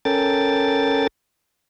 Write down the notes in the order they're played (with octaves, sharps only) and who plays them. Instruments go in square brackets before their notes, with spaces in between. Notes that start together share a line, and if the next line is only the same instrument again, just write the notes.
[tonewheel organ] C#4 A4 A#4 G5 A6